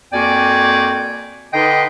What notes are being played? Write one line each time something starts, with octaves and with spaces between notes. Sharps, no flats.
F2 A#3 F#4 D5 G5 G#5
D3 D#4 B4 D#5 G5 C6